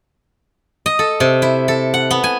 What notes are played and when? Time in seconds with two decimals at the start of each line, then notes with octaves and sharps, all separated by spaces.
0.86 D#5
0.99 A4
1.20 C3
1.42 E4
1.68 A4
1.94 F#5
2.11 B3
2.24 G#5